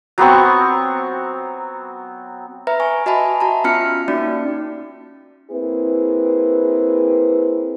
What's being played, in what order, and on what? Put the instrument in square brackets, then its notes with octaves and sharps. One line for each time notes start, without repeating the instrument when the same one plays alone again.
[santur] F#3 B3 C4 C#6
[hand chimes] B4 E5 A#5
G#5 C#6
F#4 D#5 E5 G#5 A5 B5
F#4 A5 A#5
B3 C#4 F4 E5 F6 C#7
A#3 C#4 D#4 F#4 D5
[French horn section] A#3 C4 E4 G#4 B4